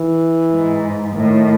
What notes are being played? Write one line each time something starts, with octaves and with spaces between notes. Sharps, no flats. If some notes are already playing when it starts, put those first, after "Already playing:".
Already playing: E3
G#2
A2 D#3